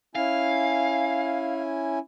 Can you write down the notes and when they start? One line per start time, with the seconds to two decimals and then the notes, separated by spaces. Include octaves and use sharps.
0.15 C#4 E4 F5 G#5